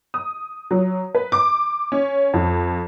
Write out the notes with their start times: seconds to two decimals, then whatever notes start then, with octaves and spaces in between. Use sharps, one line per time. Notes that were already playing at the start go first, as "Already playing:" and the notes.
0.14 D#6
0.71 F#3
1.15 B4
1.32 D6
1.92 C#4
2.34 F2